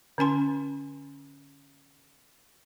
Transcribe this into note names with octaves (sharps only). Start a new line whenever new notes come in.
D3 C#4 G#5 C6